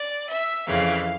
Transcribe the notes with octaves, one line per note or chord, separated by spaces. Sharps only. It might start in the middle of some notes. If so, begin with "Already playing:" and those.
Already playing: D5
E5
F2 C#3 E3 F5